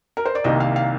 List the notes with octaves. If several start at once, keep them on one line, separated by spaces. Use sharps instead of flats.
A#4
C5
D5
C2 C3 D#3 A#3 D#5
F5
F5